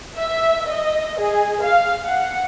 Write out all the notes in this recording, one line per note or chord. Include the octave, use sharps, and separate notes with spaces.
E5
D#5
G#4
F5
F#5